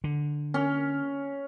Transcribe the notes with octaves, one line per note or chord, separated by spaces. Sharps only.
D3
C#4